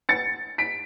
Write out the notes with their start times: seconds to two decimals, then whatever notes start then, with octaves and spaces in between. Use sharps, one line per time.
0.09 A6 C#7
0.58 B6 D7